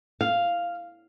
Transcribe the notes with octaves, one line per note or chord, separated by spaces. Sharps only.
F5